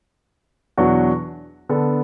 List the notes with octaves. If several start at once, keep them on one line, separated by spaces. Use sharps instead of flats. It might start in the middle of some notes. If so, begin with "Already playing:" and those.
E2 B2 F#3 D4 F#4
D3 B3 D4 A4